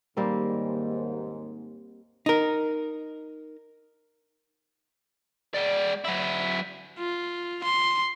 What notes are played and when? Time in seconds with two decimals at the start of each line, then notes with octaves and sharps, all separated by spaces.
0.17 D#2 G#2 G3 A#3 C4
2.26 D#4 A#4
5.55 G#3 D5
6.05 F#3 E4
6.98 F4
7.64 C6